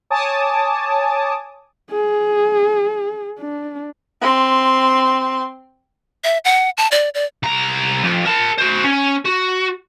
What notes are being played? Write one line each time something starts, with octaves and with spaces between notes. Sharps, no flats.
C#5 G#5 A5 D6 D#6
G#4
D4
C4 C6
E5
F#5
A5
D5
D5
C2 A#5
F2
A#4 A5
F#4 C5
C#4
F#4